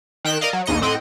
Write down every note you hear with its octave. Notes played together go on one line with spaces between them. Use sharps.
D#3 G5 F#6 E7
A#4 D5 D#5 F5
F#3
A#1 D#2 G#2 D#5 A#6 C#7
A2 C4 D#5 F#5 G5